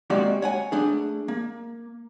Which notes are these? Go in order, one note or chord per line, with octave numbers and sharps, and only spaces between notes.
G#3 A#3 C4 F#4 G4 D5
C#5 F#5 G#5
A3 D4 G#4
A#3